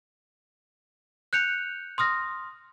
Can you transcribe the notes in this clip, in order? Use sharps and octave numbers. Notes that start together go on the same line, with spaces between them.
F#6 G6 C#7 F7
C6 D#6 F6 A#6